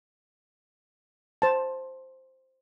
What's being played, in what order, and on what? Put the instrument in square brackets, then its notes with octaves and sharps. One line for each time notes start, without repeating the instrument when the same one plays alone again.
[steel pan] C5 A5